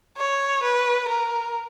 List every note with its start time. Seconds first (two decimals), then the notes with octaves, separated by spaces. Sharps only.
0.17 C#5
0.63 B4
1.08 A#4